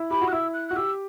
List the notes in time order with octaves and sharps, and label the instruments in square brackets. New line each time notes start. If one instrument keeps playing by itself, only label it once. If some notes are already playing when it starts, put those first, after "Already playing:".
Already playing: [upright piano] E4
[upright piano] G4 [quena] B5
[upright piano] F#4
[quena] F#6
[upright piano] E4 [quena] E6
[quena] F#6
[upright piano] F#4 [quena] F#6
[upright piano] G4 [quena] E6